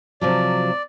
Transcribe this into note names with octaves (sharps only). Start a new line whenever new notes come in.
C3 F3 F#3 D5